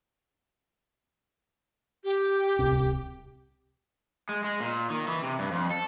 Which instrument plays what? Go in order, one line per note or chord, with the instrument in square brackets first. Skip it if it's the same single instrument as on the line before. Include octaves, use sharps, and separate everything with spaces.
[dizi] G4
[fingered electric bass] D1 C2 C3
[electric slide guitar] G#3
G#3
A#2
D#3
E3
C3
G2
F2
A4